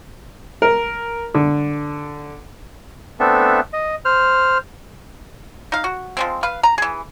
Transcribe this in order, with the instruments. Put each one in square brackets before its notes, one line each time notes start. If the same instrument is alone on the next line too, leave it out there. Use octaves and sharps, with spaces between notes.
[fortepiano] A#4
D3
[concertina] A3 B3 C4 D4 A4 E5
D#5
C5 F6
[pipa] D#4 F5
F#4
F3 G#3 C4
B4 F5
A#5
E3 G#4